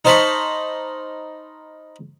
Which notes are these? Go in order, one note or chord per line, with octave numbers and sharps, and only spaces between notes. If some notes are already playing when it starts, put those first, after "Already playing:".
D#4 C5 F5 A5 B5 C#6